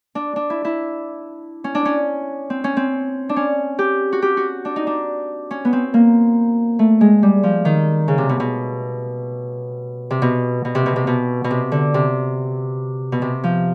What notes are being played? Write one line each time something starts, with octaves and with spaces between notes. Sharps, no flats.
D4
D4
E4
E4
C#4
D4
C#4
C4
C#4
C4
D4
C#4
G4
F#4
G4
F#4
D4
D#4
D4
C#4
B3
C4
A#3
A3
G#3
G3
F3
D#3
C#3
C3
B2
B2
C3
B2
B2
C3
B2
C3
B2
B2
C3
D3
C3
B2
C3
F3